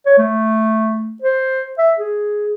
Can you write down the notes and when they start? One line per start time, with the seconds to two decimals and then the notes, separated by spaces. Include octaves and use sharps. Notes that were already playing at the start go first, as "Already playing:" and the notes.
0.06 C#5
0.18 A3
1.22 C5
1.78 E5
1.98 G#4